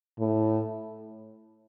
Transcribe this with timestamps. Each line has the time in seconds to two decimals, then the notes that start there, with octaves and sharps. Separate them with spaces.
0.19 A2